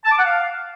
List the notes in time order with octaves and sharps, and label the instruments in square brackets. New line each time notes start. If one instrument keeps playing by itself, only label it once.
[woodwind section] A5
D6
F#5
F5